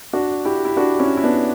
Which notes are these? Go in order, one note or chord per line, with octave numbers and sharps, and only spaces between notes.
D4 F#4
E4 G4
E4
D4 F#4
C#4 E4
E4
B3 D4